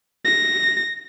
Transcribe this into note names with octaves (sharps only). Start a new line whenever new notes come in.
A#6